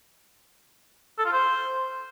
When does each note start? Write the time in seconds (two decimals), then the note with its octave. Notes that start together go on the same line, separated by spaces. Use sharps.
1.19 A4
1.26 F4
1.33 C5